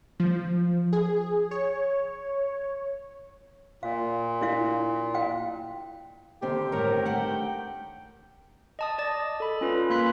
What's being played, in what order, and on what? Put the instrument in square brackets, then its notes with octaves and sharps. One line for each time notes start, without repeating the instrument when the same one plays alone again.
[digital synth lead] F3
G#4
C#5
[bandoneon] A#2 [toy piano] F5
[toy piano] D4 E4 F5
F5 G5
[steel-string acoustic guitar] D3 D#3 C4 [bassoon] G4
[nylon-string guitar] A2 C#5 [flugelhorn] A#4
[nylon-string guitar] A3 A#4 F#5 [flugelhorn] G5
[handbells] D#5 A5 D#6
D5 A5 A6
A4 B5
C#4 F4 B4
A#3 B5 C6 F#6 B6